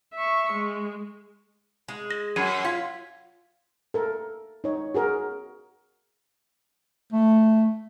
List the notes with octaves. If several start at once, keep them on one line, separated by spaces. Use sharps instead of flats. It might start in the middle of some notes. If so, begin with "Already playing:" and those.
E5 C#6
G#3
G#3
A#6
F#2 B5 G#6 D#7
F4 G#6 B6
A4 A#4
D#4 C#5
F#4 G#4 A#4
A3